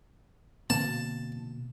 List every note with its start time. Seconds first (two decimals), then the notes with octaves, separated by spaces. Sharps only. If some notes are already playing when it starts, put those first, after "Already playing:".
0.70 B2 D3 A#3 C4 A5